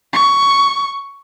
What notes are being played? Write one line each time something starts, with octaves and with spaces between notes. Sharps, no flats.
C#6